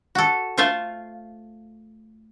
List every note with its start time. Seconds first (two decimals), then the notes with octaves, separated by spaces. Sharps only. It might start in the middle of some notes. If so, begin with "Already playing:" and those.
0.15 F#4 A4
0.57 A3 F4 C5 E5 F5